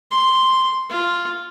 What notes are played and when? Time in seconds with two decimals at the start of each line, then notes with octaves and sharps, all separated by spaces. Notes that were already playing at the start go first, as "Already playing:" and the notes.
0.11 C6
0.90 F4